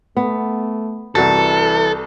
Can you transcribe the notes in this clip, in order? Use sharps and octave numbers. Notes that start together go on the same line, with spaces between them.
A3 B3
C2 E3 F#4 A4 A6